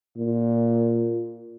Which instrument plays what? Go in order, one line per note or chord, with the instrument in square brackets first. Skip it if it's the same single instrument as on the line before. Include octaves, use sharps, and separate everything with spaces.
[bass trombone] A#2